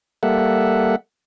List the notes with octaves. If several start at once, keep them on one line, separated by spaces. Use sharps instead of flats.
G3 A#3 A4 E5 F#5